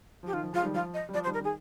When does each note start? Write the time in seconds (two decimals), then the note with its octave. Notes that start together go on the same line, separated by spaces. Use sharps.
0.23 F3 G4
0.33 D#3 F4
0.43 F3
0.53 F3 G#3 F4
0.63 D#3 G3
0.73 F3 F4
0.94 D#5
1.09 G3
1.13 F3 D5
1.24 C5
1.27 D#3 G3
1.33 A#4
1.41 D#3 G#4